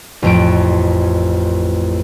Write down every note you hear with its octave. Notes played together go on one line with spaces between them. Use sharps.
A1 F2 D7